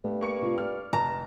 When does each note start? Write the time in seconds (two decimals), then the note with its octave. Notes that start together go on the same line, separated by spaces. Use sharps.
0.04 G2 A3 B3
0.21 A#3 C#6 C#7
0.42 C3 F4
0.58 D5 F6
0.93 F1 A5 A#5